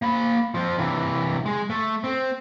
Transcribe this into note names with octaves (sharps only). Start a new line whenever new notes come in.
A#3 B5
F3 C4
C3 E3
G#3
A3
C4